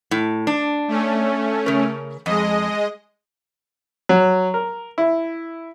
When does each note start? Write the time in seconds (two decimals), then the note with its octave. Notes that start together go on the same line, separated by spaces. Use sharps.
0.11 A2
0.47 D4
0.88 A3 C#4
1.66 C#3 A#4
2.26 F2 G#3 D#5
4.09 F#3
4.54 A#4
4.98 E4